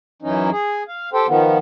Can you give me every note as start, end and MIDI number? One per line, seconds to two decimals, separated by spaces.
0.22 0.50 42
0.22 0.50 52
0.22 0.50 61
0.22 0.50 63
0.51 0.83 68
0.88 1.10 77
1.13 1.27 67
1.13 1.27 69
1.13 1.27 72
1.13 1.27 79
1.27 1.58 51
1.27 1.58 53
1.27 1.58 59